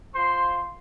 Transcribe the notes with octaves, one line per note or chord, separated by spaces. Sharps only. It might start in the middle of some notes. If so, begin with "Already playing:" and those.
F4 C5 C6